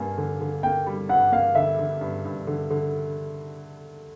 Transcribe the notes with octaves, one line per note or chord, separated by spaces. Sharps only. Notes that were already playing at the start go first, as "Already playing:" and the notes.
Already playing: G2 A#3 G#5
D3
D3
A#3 G5
G3
G2 F#5
A#3 F5
D3 E5
D3
G2
G2
D3
D3